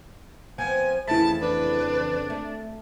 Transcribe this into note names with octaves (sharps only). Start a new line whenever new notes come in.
F3 B3 C4 G#5
F2 C#3 E3 A3 A5 B5
D4 B4
A3